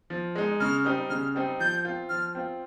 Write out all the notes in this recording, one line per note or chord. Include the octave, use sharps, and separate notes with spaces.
F3
G#3 D#4
C#3 F6
G3 C4 D#4
C#3 F6
G3 C4 D#4
F3 G6
C4 F4
F3 F6
C4 F4